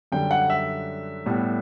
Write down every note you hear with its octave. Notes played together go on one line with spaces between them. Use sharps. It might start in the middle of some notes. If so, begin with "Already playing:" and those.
F#2 D3 G3 G5
F#5
E5
A2 G3 B3